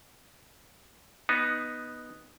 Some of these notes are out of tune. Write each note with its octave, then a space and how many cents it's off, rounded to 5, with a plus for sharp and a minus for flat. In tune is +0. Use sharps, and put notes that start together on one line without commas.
B3 -5 D#4 +0